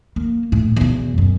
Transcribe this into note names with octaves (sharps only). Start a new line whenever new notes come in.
A#3
A2
E2 B2
F#2